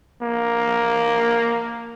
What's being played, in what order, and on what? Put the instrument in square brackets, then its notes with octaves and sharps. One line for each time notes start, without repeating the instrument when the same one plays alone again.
[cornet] A#3